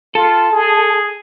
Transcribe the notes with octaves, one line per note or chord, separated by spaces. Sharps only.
F4 A4
G#4